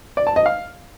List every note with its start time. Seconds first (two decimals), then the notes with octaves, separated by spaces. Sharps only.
0.17 D5
0.27 A5
0.36 D#5
0.46 F5